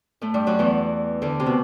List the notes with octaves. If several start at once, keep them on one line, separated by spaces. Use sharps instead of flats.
A2 A3
G2 G3
F#2 F#3
E2 E3
D2 D3
C3
B2